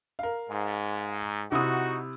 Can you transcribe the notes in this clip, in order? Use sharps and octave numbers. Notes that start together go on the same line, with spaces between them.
A#4 F5
G#2
C3 D#4 E4 F#4 D#6